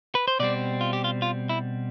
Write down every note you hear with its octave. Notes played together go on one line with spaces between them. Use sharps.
B4
C5
B2 G3 C4 D5
F4
G4
F4
F4
E4